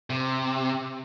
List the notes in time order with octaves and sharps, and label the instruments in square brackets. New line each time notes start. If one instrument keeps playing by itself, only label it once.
[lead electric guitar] C3